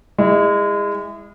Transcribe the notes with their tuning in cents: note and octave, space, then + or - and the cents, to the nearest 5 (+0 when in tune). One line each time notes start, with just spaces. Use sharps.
G#3 -30 E4 +0